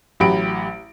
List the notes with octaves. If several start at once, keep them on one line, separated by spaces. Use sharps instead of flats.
A1 F#3 G4 B5 D7